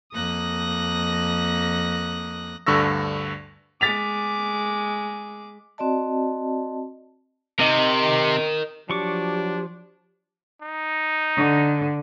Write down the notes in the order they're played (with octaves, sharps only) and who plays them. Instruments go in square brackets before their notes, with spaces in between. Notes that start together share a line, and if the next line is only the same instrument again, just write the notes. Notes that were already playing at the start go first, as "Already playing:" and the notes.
[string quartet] F2 A#3 D#6 F#6 A#6
[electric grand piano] D2 G2 D3 C#6 E6 A#6
[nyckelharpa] G#3 D6 [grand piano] A6 B6 F7
[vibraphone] C4 F#4 D5 D#5 A5
[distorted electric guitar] C3 [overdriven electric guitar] A#4 D#5
[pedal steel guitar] F3 C#6 D6 [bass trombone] F#3 [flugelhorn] D4 [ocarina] G4
[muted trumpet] D#4
[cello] D3